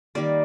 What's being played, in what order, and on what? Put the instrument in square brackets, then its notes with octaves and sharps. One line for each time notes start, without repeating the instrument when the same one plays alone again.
[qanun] D#3 G3 A#3 D5